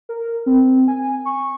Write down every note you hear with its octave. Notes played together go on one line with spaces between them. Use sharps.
A#4
C4
G#5
C#6